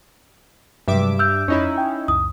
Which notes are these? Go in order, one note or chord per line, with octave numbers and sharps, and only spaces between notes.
G2 C3 F#3 G#3 E5 D6
E6 F6 G6
F2 C#4 D#4 E4 C#5
G5
C#2 F#2 D#6